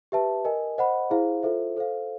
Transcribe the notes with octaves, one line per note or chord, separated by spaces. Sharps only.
G4 B4 E5 A5
A#4 D#5 G#5
C5 D#5 F#5 B5
E4 G#4 C5 F5
F4 A4 C5 E5
A4 C5 F5